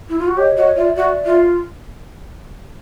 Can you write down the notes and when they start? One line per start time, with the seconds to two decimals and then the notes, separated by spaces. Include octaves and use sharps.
0.09 E4
0.19 F4
0.28 F#4
0.37 G4 C#5 D#5
0.57 F#4 C#5 D#5
0.76 F4 D5 E5
0.96 F#4 D5 E5
1.25 F4